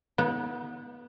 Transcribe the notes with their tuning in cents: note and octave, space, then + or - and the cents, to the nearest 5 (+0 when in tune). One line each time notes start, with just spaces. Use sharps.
B3 -20 D#4 +35